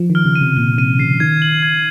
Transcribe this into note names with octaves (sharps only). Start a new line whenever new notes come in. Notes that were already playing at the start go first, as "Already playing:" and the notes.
Already playing: F3
D#3
F6
C#3
D#7
C3
A#2 F6
C3 D#7
C#3 C7
D#3 G#6
F#7
G#6